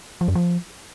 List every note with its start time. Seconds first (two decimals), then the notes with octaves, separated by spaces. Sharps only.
0.21 F3
0.28 F#2
0.35 F3